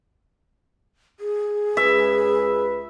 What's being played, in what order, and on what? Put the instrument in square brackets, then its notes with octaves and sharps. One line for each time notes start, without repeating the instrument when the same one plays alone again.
[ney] G#4
[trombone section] C#2 B4 [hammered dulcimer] E5